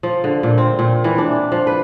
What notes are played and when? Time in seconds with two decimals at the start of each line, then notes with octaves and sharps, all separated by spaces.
0.03 F3
0.24 D3
0.43 A#2
0.58 C4
0.79 A#2
1.04 E3
1.18 D4
1.52 F3
1.67 B4